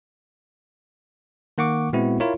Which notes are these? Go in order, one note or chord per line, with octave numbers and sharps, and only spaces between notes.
D#3 A#3 F#5 C#6 D6
A#2 G#3 B3 C4 E4 F#4
E4 F4 A#4 C#5